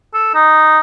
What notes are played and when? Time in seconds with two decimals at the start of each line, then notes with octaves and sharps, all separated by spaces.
0.14 A4
0.35 D#4